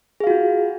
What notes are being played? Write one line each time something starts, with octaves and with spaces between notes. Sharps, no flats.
F4 F#4 G#4 F5